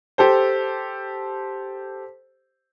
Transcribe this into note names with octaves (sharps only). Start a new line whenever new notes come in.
G4 A4 C5